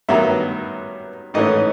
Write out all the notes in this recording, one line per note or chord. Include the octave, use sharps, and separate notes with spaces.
G2 D#3 F#3 B3 D#4 E5
G#2 E3 A3 C#4 D#5